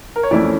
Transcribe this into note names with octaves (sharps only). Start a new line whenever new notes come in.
A#4
C#5
F2 E3 A3 C#4 E4 D5